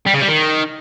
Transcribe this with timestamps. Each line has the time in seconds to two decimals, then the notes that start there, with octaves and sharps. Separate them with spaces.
0.07 G3
0.14 C#3
0.21 G3
0.28 D#3